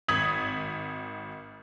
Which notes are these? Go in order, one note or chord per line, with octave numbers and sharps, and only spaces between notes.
G#1 D#6 G#6 B6 F#7